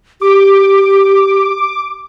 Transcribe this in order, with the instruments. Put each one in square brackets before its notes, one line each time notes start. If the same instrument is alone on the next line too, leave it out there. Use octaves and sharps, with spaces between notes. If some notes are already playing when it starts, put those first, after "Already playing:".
[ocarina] G4 [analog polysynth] D6